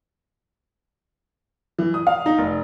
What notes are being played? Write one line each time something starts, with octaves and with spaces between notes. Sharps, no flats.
E3
D#6
F5
D#4
F1